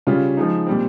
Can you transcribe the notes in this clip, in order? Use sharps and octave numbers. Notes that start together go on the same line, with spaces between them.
C#3 G3 C#4 F4
F3 G#3 D#4
A#2 G3 C4